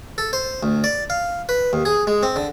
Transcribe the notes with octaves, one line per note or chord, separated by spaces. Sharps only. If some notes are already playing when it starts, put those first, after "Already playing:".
A4
C5
D2
D5
F5
B4
D#2
G#4
G#3
C4
D3